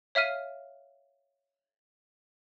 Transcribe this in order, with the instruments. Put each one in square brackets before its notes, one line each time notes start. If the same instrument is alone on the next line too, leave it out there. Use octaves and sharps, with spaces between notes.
[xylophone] C#5 E5 F5 F6 D#7